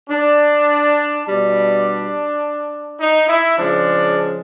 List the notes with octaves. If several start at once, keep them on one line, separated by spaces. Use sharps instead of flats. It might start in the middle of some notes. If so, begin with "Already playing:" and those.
D4
B2 G3 D4
D#4
E4
C#3 F3 G#3 D4